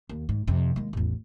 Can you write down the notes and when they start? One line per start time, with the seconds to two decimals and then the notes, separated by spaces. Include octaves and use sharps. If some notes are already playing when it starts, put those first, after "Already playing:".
0.09 D#2
0.29 G#2
0.47 F2 C3
0.76 D#2 G#3
0.93 A1 E2